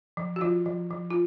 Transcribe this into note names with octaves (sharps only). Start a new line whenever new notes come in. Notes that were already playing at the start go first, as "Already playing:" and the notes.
F3
F#4
F3 F4
F3
F3
F4